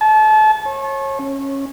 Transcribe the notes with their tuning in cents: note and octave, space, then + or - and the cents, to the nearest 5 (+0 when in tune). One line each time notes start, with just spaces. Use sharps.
A5 -30
C#5 -30
C#4 -15